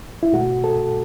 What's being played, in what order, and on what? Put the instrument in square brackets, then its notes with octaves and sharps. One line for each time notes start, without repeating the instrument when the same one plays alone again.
[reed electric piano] E4
B2 A3 F#4
A4